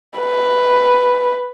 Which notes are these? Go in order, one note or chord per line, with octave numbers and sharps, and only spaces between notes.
B4